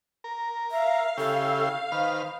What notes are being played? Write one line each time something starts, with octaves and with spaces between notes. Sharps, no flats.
A#4
E5 F5
C#3 E4 G4 A4
D#3 B4 C5 F6